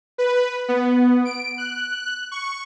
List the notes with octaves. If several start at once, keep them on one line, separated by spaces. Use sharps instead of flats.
B4
B3
D7
F#6
C#6